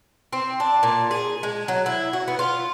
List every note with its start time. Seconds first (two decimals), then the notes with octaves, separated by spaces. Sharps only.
0.33 C4
0.60 D4
0.83 A#2
1.11 G#4
1.43 G#3
1.68 F#3
1.86 E4
2.13 F#4
2.28 B3
2.39 F4